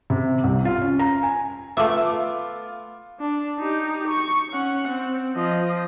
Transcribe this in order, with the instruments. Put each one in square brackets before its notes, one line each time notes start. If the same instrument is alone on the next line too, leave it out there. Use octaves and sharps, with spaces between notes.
[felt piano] C3
C2
F4
C#4
A#5
G#5
[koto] A3 E5 [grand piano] B3 F4 D6
[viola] D4
D#4 G4
C#6
C#4 F#5
C4
F3 D#5